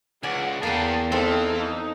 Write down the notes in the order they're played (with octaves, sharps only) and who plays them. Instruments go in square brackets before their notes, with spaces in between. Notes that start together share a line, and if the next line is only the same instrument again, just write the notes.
[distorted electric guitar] C#2 [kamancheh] G#4 F#5 [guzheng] D5 G#5
[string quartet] E2 [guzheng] A#3 B4 G5 [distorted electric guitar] B3 G#4 [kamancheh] A5
[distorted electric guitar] E3 [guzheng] C4 A4 [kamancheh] D#4 F5
[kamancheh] D#4